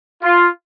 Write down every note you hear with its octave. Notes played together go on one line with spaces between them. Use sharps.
F4